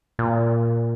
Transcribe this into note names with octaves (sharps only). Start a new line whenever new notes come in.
A#2